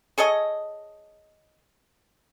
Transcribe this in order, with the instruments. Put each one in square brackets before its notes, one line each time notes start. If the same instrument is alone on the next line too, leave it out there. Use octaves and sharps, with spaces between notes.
[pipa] G#4 A4 C#5 D#5